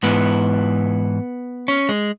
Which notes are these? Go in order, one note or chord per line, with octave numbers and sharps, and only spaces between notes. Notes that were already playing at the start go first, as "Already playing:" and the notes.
G#2 E3 B3
C#4
G#3